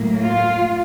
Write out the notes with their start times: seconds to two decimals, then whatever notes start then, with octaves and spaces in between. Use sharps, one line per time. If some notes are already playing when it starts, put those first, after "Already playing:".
Already playing: A2 F#3 A#3
0.22 F4